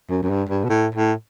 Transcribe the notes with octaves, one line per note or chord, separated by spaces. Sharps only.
F#2
F#2
G2
G2
B2
A2
A2